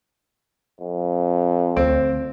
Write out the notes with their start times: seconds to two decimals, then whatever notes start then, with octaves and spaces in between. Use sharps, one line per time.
0.80 F2
1.77 D2 C4